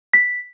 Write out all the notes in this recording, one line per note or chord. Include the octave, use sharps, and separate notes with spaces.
B6